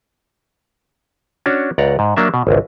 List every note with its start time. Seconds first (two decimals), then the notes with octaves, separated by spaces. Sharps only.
1.46 C#4 D4 F#4 C#5
1.78 C#2 D5 F#5 A#5
1.99 G#2
2.16 F#3 A#3 D4 E5
2.34 B2
2.47 G#1 C#2